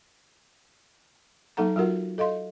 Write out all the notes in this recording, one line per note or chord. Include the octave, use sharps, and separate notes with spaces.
F#3 A#3 D#4 A4 F#5 A#5
F#3 F4 F#4 A#4 F#5
A4 D#5 F5 C6